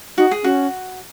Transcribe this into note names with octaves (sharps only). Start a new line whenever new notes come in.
D#4 F#4
G#4
C#4 F#4